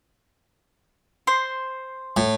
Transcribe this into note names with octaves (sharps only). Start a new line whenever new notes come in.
C5 C6
A2